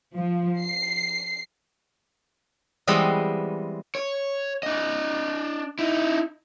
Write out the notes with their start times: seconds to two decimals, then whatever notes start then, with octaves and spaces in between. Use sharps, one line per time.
0.15 F3
0.60 C7
2.87 E3 G3 G#3 B3 C4 D#5
3.95 C#5
4.63 D4 D#5
5.79 D#4 E4